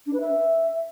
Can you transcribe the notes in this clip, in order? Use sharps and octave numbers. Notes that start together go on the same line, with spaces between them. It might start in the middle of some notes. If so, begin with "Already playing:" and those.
D4
B4
E5